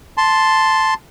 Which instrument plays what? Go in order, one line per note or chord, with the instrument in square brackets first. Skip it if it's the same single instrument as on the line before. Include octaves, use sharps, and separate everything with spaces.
[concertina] A5 C6